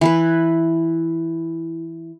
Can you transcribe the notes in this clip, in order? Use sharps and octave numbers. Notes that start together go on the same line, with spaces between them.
E3 E4 B4